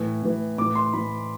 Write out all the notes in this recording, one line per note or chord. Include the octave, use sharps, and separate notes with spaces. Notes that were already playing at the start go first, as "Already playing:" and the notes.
Already playing: A2 E3
A2 E3
A2 E3 D6
C6
A2 E3 B5